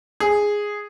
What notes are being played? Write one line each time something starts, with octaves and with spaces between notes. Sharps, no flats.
G#4